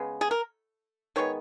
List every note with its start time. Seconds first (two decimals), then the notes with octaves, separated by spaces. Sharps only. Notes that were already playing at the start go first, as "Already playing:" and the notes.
Already playing: C#3 G#3 B3
0.21 G#4
0.31 A#4
1.16 D#3 G#3 B3 C#5